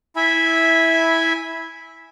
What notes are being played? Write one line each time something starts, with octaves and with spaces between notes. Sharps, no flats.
E4 E5 G#5 B5